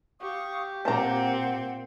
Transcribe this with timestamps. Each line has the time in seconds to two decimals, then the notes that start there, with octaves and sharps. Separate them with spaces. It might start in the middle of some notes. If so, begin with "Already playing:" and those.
0.21 G4 F5 C#6 D#6
0.85 A#2 C4 F#5 A5 A#5